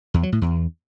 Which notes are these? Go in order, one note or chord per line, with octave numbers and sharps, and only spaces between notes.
E2
F#3
A2
E2